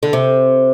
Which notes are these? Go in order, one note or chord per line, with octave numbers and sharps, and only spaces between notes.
D3
C3